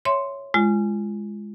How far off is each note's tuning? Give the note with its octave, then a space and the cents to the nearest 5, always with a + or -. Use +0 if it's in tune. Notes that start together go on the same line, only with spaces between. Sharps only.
C#5 +0 E5 +0 C6 +0
G#3 +0 F4 -30